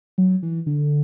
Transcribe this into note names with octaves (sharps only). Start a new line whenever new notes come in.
F#3
E3
D3